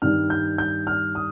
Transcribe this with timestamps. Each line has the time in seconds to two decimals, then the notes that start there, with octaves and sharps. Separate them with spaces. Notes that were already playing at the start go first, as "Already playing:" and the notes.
0.02 G2 D#3 G3 F6
0.30 G6
0.58 G6
0.87 F6
1.15 D#6